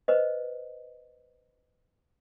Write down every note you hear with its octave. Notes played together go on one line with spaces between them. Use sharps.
B4 C5 D#5